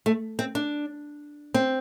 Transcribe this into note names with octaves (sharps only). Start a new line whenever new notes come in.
A3
C4
D4
C4